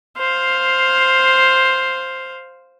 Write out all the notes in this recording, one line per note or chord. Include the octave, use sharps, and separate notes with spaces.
C5 F5